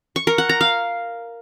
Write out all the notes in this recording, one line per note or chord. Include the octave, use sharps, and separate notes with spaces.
C#6
A#4
F#5
A#5
F5